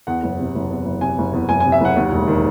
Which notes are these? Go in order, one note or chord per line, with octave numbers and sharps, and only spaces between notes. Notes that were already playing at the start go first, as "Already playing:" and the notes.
E2 F#5
F#1
C3
F#1
E2
F#1
C3 G#5
F#1
E2
F#1 G#5
C3 G#5
E5
F#1 F#5
D#2
E1
D#3